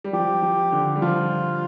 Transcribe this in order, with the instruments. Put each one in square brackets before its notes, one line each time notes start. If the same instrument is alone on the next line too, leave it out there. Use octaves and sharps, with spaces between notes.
[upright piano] G3
[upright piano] F3 [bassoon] G4
[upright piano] F3
D3
G3
[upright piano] F3 [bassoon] F4